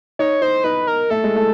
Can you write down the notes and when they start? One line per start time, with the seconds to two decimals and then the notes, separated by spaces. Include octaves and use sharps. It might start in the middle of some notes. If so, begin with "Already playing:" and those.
0.19 D#4 C#5
0.42 D#4 C5
0.64 D#4 B4
0.87 A#4
1.10 A3 A4
1.24 G#3
1.36 A3